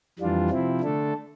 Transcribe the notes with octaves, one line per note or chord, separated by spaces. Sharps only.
F2 E3 G3 D4 F4
C3 F3 C4 E4
D3 A3 D4 A4